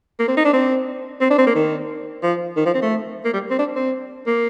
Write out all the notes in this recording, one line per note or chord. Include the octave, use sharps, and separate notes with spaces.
A#3
C4
D#4
D4
C4
C4
D4
C4
A#3
D#3
F3
D#3
F3
C4
A3
A#3
G3
C4
D4
C4
A#3